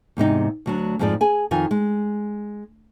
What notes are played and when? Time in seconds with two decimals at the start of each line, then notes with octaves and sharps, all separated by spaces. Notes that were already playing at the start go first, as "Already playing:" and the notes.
0.17 E2 G#2 C3 D#4
0.66 D2 F#3 D4
0.99 F2 G#2 F3 G#4 D5
1.21 G#4 G#5
1.51 F2 D#3 F4 G#5
1.71 G#3